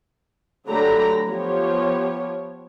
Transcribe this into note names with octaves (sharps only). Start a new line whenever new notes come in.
D3 F#3 A3 G4 A#5 B5
F3 B3 G4 C#5